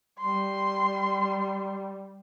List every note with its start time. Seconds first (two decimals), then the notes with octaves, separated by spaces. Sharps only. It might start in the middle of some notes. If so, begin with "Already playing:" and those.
0.19 G3 C6